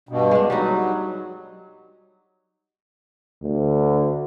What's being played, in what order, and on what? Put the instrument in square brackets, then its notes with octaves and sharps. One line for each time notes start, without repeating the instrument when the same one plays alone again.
[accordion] G2 B2
[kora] G#3 D4
[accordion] F#3 [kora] G3 D#4 F#4
[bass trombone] D2